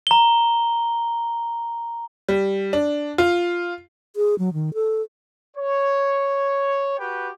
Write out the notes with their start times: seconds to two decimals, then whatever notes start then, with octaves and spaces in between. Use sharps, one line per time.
0.07 A#5 G7
2.29 G3
2.73 D4
3.18 F4
4.16 G#4
4.39 F#3
4.53 D#3
4.74 A4
5.56 C#5
6.99 F#4 G4 B4 G5